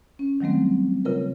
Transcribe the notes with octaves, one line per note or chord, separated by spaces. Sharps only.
C#4
D#3 F#3 G3 A3 C4
C#3 F4 A#4 B4